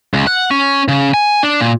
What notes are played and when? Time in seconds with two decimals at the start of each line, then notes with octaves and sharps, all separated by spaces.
0.14 C#2
0.27 F#5
0.51 C#4
0.88 C#3
1.14 G#5
1.43 D4
1.60 A#2